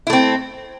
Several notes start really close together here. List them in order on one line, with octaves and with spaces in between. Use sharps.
E4 A3 C4